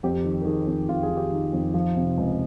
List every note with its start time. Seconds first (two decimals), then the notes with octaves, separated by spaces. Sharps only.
0.03 F2 G4
0.24 D#3
0.41 A#4
0.45 D#3 G#4
0.67 F2
0.88 F2 F4
1.03 G#4
1.10 D#3
1.17 G4
1.31 D#3 D#4
1.53 F2
1.74 F3
1.96 C3
2.17 C#2